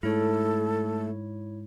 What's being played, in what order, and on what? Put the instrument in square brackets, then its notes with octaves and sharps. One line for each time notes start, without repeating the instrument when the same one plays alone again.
[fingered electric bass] G#2 [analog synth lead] A3 [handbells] E4 C#5 [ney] A4